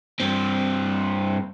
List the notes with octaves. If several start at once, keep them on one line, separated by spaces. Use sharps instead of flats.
G2 C4